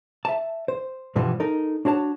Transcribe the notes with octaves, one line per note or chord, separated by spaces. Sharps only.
E5 A5
C5
G2 B2 E3 F3 G3
D#4 A4 A#4
D4 F#4 C#5 A5